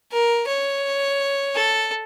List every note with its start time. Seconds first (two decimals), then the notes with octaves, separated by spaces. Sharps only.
0.12 A#4
0.47 C#5
1.55 A4